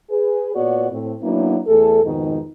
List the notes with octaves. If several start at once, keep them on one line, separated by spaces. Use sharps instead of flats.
G#4 B4
A#2 B3 F#4 C#5 D5
A2 C4
F#3 A#3 B3 C#4 D4 E4
E2 A3 G#4 A4
F2 G#2 B2 D#3 G#3 D#4